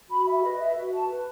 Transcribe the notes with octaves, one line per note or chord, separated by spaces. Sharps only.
F#4 B5
E5
B4 D#5
E5
F#4
A5
B4